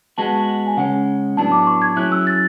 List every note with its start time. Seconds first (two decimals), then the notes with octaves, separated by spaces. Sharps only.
0.18 G#3 B3 F#4 A5
0.67 G#5
0.77 C#3 G#3 C#4 F#5
1.37 A2 F#3 B3 D4 A5
1.52 D6
1.67 C#6
1.82 G#6
1.96 F#3 C#4 E4 G#4 F#6
2.12 E6
2.27 A6